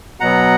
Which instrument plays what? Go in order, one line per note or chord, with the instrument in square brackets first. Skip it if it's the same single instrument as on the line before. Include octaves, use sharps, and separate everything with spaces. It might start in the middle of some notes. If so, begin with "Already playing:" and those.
[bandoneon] B2 F#3 B3 F#5 A#5